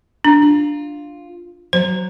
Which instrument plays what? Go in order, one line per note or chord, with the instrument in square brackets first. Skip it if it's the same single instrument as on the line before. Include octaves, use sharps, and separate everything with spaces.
[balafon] D4
[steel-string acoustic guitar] F4
[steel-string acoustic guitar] F#3 [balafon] C5